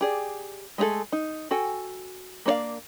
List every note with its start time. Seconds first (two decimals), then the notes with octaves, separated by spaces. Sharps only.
0.01 G4 G#4 D5
0.78 G#3 A3 D4 G#4 A4
1.12 D#4
1.51 F#4 A4 G5 G#5
2.46 A#3 D4 C#5 D5 F5